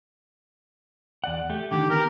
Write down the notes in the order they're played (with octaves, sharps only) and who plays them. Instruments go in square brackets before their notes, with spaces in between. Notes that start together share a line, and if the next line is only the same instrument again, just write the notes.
[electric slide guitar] E2 D5 F#5
A3 G4
[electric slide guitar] D3 D#3 [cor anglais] G4
[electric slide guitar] B3 G4 [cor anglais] A#4